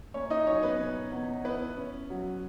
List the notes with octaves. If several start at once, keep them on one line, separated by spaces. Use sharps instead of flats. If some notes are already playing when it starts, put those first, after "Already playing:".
A#3 C#4 C#5
D#4 D#5
F#3 C#4 C#5
B3 B4
B2
E2
B3 E4 B4
C#4
F#3